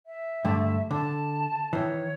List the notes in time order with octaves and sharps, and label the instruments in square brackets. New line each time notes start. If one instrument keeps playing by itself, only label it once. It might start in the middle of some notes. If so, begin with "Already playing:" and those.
[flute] E5
[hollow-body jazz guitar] G2 D3 A3
[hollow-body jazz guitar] D3 [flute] A5
[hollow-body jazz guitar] D#3 E3 [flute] C#5